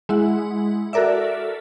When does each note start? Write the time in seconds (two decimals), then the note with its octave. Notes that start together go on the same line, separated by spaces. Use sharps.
0.09 G#3 E4 F#5
0.93 F#4 A4 A#4 D5 E5